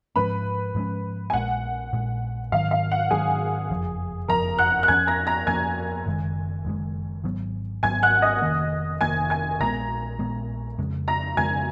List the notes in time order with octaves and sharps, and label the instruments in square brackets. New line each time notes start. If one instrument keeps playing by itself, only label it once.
[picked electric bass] G#2 F3 G#3 C#4 [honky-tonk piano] B4 B5
[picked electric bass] G#2 F3 G#3 C#4
[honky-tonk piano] G#5
[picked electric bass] A#1 A#2 G#3 [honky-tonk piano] F#5
[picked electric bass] A#1 A#2 G#3
[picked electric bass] G#2 D#3 F#3 [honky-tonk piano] F5
[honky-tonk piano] F5
F#5
[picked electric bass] G#2 D#3 F#3 [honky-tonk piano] G#4 G#5
[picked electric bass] F#1 F2 F3
[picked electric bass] F#1 F2 F3 [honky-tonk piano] A#4 A#5
[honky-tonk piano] F#5 F#6
F#6
[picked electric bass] F2 F3 A#3 C#4 [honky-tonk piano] G#5 G#6
[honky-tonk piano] A#5 A#6
A#5 A#6
[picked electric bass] F2 F3 A#3 C#4 [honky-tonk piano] G#5 G#6
[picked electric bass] F#1 F#2 D#3 G#3
F#1 F#2 D#3 G#3
G#1 G#2 F#3 B3
[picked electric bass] G#1 G#2 F#3 B3 [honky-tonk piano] G#5 G#6
[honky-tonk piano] F#5 F#6
D#5 D#6
[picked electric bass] F1 F2 D#3 A#3
[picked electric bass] F1 F2 D#3 A#3 [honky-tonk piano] G#5 G#6
[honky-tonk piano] G#5 G#6
[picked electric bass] A#1 A#2 G#3 B3 [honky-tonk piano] A#5 A#6
[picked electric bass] A#1 A#2 G#3 B3
F2 C#3 G#3
[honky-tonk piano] A#5 A#6
[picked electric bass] F2 C#3 G#3 [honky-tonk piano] G#5 G#6